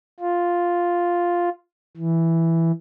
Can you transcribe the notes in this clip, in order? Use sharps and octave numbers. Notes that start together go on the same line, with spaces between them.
F4
E3